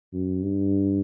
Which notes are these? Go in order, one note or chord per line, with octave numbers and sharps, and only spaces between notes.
F#2
G2